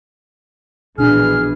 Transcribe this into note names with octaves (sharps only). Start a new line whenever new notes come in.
A#1 B2 E3 D4 G#4 F6